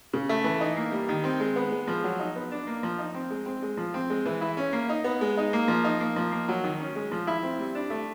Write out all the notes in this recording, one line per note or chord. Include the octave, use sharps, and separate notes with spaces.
C#3
A3
E3
D#4
A#3
G3
D#3
C4
G#3
B3
G#3
F3
F#3
D#4
B3
D4
A#3
F3
D#4
C4
G#3
C4
G#3
F3
C4
G#3
E3
E4
C#4
A#3
D#4
B3
G#3
D#4
A#3
F3
D#4
A#3
F3
A#3
F#3
D#3
C#4
G#3
F3
E4
C4
G3
D4
A3